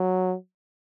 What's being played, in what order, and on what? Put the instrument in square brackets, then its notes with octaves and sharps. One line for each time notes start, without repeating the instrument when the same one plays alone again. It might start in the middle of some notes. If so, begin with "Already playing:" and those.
Already playing: [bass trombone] F#3